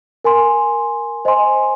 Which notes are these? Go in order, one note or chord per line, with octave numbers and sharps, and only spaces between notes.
A#4 G#5 C6
C5 D#5 G#5 C6